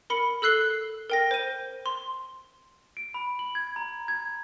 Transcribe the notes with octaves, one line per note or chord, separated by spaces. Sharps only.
A#4 B5 C#7
A4 E6 F#6 C7 G7
A#4 G5 A#6
C5 D#7
C6
D7
B5
F#7
G#6
A#5
G#6